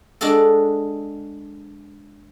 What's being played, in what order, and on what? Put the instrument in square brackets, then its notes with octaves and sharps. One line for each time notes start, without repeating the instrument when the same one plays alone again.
[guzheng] G#3 D4 F#4 G#4 A4